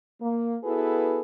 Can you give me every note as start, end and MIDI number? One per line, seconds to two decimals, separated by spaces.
0.20 0.56 58
0.63 1.22 59
0.63 1.22 64
0.63 1.22 66
0.63 1.22 68
0.63 1.22 69
0.63 1.22 71